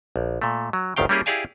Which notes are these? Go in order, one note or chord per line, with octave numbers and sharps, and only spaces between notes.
A#1
A#2 A3
F#3
G1 D2 D#3 F5 G5
G3 A#3 C#4 E4 G4 G#4
E4 G4 G#4 D5 F5 G#5